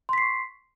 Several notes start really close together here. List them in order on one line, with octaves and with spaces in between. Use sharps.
C6 B6 C7 C#6